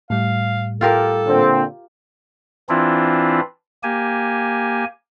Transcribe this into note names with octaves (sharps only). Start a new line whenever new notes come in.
A2 G3 F5
F4 G4 A4 A#4
A#2 D3 C4
E3 C4 D4 E4 F4
A#3 G4 G#5